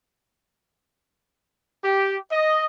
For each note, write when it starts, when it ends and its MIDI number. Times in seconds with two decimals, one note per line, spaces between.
1.83 2.17 67
2.31 2.66 75